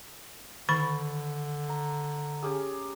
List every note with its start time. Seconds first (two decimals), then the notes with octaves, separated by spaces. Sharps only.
0.69 D3 D#3 B5
1.69 A#5
2.43 C#4 G4 G#4